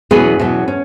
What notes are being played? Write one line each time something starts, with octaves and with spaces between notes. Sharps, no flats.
E2 B2 F#3 C#4 G#4 B4
E2 B2 F#3 C#4
C#4